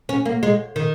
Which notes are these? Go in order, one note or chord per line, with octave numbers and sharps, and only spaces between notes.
C#4
A#3
G#3
D#3